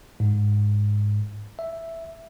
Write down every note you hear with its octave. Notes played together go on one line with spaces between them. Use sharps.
G#2
E5